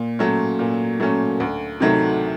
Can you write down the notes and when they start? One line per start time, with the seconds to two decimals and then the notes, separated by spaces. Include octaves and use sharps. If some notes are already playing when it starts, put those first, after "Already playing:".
Already playing: A#2
0.19 F#3 A3 C#4
0.59 A#2
1.00 F#3 A3 C#4
1.40 D2
1.80 C3 D#3 F#3 A3